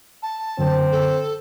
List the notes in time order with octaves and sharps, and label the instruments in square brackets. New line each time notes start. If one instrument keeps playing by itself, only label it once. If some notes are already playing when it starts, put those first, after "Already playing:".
[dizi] A5
[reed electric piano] F#2 D3 [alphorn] C4
[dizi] A4